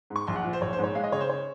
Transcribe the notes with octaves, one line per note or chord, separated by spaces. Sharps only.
G#2
C#6
A#1 C6
F#5
F3
C5
A#1 C#5
C5
G#2
C#5
G#3 F5
D#5
C#3 C#5
C5
C#5